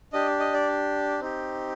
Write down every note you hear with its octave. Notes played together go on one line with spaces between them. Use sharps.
D4 G4 D#5
D#5
D5
C4 D#4 G4